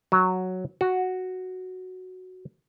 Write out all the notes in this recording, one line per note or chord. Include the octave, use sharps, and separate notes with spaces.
F#3
F#4